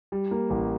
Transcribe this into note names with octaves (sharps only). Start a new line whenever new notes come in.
G3
A#3
A1